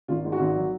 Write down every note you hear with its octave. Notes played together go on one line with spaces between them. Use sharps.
G#1 F4
G#2
F#4
G#1
F#3